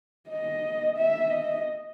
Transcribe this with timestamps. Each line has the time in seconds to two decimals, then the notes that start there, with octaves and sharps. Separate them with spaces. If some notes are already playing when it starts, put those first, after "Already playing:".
0.29 D#5
0.97 E5
1.30 D#5